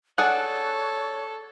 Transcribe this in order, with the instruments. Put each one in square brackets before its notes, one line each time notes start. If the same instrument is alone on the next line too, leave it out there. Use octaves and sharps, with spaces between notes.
[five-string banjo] D4 G#4 D5 [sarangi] A4 [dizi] C#5 [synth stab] F#5